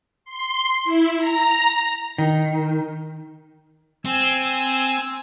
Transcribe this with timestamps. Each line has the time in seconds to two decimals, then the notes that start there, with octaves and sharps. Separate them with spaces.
0.25 C6
0.85 E4
1.17 A#5
2.18 D#3
4.05 C4 G#5 E6